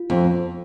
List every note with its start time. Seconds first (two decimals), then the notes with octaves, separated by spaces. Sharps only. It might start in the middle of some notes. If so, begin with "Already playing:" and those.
Already playing: F4
0.10 F2